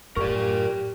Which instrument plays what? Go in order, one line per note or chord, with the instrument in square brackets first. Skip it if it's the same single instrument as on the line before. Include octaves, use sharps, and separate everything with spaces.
[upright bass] F#2 A2 [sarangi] G4 [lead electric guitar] A#4 D5 [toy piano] C#6